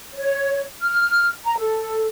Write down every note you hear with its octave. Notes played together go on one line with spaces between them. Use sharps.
C#5
F6
A#5
A4